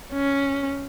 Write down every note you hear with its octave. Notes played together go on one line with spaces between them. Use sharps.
C#4